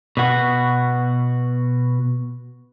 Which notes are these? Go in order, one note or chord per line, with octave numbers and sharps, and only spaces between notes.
B2 F#4